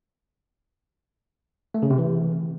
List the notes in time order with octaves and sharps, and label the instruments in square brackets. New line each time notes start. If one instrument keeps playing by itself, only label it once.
[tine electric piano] A3
C#3
C3
E3